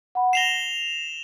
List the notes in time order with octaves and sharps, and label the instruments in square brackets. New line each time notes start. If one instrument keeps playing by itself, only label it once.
[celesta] F#5 B5
[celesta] A#6 C7 [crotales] E7 F7 G7